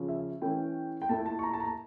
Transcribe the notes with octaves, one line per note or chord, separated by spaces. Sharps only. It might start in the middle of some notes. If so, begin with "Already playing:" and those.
Already playing: C#3 F3 C#4 F4
E5
E3 A3 C#4 E4 G5
G5
A#2 A3 E4 A5
A5
C#6
A#5
A5
A#5